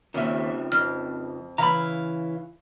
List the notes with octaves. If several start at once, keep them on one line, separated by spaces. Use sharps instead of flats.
D#2 C#3 F3 C4 E5
F2 F6
C#3 E3 F5 A#5 B5